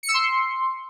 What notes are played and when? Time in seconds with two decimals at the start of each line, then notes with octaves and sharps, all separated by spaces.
0.03 C#7
0.09 E6
0.14 C6